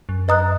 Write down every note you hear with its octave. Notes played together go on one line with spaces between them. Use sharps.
F#2
B4 D#5 A#5 D#6 F#6